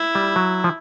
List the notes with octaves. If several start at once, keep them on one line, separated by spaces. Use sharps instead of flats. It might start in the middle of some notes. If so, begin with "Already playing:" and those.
Already playing: E4
G3
F#3
F3